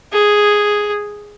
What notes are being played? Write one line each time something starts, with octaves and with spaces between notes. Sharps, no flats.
G#4